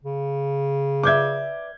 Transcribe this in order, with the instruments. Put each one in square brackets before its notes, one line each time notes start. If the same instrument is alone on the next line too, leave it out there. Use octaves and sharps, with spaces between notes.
[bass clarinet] C#3
[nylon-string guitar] B4 D5 E5 [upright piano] D6 G6 G#6